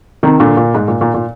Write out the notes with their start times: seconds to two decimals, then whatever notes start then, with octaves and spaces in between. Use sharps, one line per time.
0.23 C3 D#3
0.40 A#2 D3
0.57 A#2
0.74 G#2
0.88 A#2
1.01 A#2
1.14 A#2